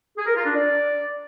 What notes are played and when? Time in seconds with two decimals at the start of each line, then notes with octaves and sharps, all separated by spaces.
0.17 G#4
0.26 A#4
0.36 F4
0.45 D4
0.54 D5